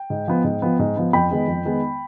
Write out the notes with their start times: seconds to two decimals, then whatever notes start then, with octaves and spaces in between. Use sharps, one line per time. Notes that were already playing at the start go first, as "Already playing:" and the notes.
Already playing: G5
0.10 G#2
0.28 F3 B3
0.44 G#2
0.62 F3 B3
0.79 G#2
0.96 F3 B3
1.13 F2 G5 B5
1.31 D#3 G#3 B3
1.48 F2
1.65 D#3 G#3 B3